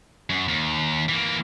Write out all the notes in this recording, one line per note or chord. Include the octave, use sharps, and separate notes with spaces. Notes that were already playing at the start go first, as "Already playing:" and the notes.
F#2
D#2
E3 A#3